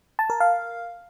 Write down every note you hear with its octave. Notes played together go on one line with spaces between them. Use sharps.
A5
A#4
F5